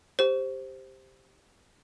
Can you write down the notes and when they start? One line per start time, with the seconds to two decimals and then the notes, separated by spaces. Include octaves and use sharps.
0.19 G4 C5